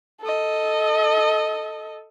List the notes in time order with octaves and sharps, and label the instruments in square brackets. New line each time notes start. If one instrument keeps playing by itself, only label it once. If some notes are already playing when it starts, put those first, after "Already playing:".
[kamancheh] A4 D#5